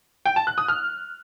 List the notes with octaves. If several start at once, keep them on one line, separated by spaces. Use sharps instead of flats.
G5
A5
F#6
D#6
F6